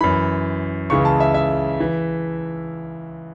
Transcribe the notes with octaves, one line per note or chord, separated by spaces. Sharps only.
F#2 E3 B5
C#2 C#3 E3 C#6
A5
E5
E5
E3